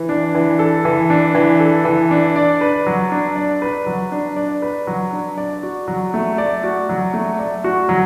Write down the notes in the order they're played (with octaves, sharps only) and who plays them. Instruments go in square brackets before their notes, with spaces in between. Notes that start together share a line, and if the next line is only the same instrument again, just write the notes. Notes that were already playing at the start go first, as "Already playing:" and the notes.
Already playing: [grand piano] E3
D4
E3
A4
E3
D4
E3
A4
E3
D4
D5
B4
F#3
D4
D5
B4
F#3
D4
D5
B4
F#3
D4
D5
F#4
F#3
A3
D5
F#4
F#3
A3
D5
F#4
F#3